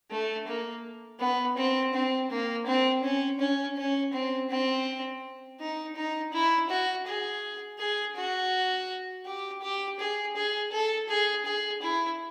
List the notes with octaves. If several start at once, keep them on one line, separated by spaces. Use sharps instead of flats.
A3
A#3
B3
C4
C4
A#3
C4
C#4
C#4
C#4
C4
C4
D#4
D#4
E4
F#4
G#4
G#4
F#4
G4
G4
G#4
G#4
A4
G#4
G#4
E4